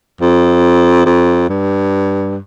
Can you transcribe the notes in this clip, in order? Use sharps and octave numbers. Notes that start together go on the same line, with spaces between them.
F2
F2
G2